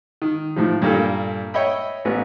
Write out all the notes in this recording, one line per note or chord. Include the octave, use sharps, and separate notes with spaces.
D#3
A2 D#3 F3
G2 A#2 A#3 A4
C#5 D#5 E5 G5 B5
A1 B3